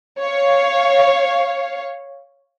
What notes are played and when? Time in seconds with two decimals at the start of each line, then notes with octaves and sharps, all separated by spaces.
0.19 C#5 F5